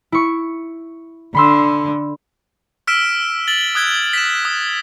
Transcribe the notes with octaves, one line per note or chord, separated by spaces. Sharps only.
E4 C#6
D3 B5 C6 E6
E6 F6 B6 D7 E7
A6 F#7 G7
D#6 F#6 G#6 G7
B6 E7
D#6